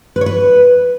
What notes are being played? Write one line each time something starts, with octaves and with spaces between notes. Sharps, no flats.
B4
C#5
B4